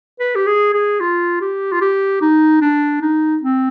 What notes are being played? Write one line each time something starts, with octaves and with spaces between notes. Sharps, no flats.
B4
G4
G#4
G#4
F4
G4
F4
G4
D#4
D4
D#4
C4